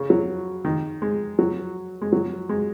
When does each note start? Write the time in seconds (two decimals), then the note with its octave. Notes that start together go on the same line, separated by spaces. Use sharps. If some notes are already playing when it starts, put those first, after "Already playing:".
Already playing: C#3
0.10 F#3
0.65 D#3
1.02 G#3
1.39 F#3
2.02 G#3
2.12 F#3
2.49 G#3